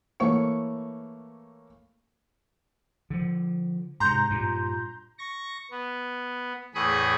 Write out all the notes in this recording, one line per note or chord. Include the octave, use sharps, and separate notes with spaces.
E3 A3 A#3 C#5 C#6 C#7
D3 F3
G#2 C3 A#5 C6 G6
G2 A#2
C#6 A#6
B3
E2 A2 G#4 B5 C#6 D#6